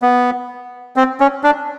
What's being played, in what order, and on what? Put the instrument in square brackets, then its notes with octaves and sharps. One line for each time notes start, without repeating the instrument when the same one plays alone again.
[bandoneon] B3
C4
C#4
D4